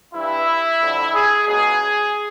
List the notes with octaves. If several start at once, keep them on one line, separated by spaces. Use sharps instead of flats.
G2 E3 G3 E4
F2 D3 G3
G#4
C#2 B2 F#3 G#4